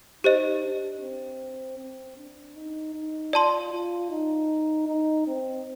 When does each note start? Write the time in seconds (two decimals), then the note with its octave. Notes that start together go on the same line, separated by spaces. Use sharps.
0.24 D#4 G4 C5 D#5
0.63 D4
1.01 C4
1.78 C4
2.17 D4
2.56 D#4
2.94 D#4
3.33 F4 D5 A5 C6
3.73 F4
4.11 D#4
4.88 D#4
5.27 C4